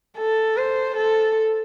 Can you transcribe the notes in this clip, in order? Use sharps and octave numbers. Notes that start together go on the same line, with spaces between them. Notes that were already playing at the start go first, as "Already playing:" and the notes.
A4
C5
A4